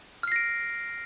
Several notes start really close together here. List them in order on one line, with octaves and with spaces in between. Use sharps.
F6 C7 A#6 D7